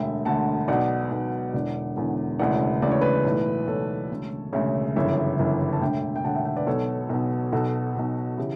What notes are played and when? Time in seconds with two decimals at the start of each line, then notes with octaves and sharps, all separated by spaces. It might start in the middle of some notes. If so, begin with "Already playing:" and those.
Already playing: E1 D2 D3 E5 G5
0.25 E1 D2 D3 F#5 A5
0.68 B1 B2 D5 F#5
1.11 B1 B2
1.53 E1 E2 D3 D5 F#5
1.96 E1 E2 D3
2.39 E1 D2 C#3 E3 D5 F#5
2.82 E1 D2 C#3 E3 D5
2.91 C#5
3.01 B4 D5
3.24 B1 A2 E3
3.67 B1 A2 E3 A4 C#5
4.11 E1 D2 C#3
4.53 E1 D2 C#3 C#5 E5
4.96 G1 F#2 C#3 E3 C#5 E5
5.39 G1 F#2 C#3 E3
5.73 A5
5.81 E1 D2 D3 E5 G5
6.16 G5
6.24 E1 D2 D3 F#5 A5
6.35 E5 G5
6.45 E5 G5
6.57 B4 D5
6.67 B1 B2 A4 C#5
7.09 B1 B2
7.52 B1 B2 F#4 A4
7.95 B1 B2
8.37 C#3 E3 E4 G4